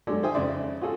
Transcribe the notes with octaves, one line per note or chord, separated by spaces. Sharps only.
F#3 G#3 D4 G4 A4
D#3 C5 E5 G5 G#5 D#6
F2 C#3 D5 E5 C6
F4 F#4 G#4 A4